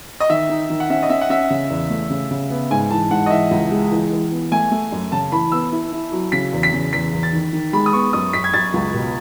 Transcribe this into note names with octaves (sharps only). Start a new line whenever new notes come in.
D#5
D#3 E5
D#4
D#3
F#5
C#4 E5
D#5
C#4 E5
F#5
C#4 E5
C#3
E2
A3
C#3
C#3
B3
G#2 G#5
E3 A5
G#2 F#5
D#5
E3 E5
C#2
G#3
E3
E3
B3
A3 G#5
A3
F#2
C#3 A5
E3 B5
B3 E6
E4
E4
F#3
C#3 B6
E2
B6
C#3
E2 B6
E2
A6
D#3
D#3
G#3 B5
D#6
B3 C#6
F#2 D#6
F#2 B6
G#6
F#2 A6
C#2
B2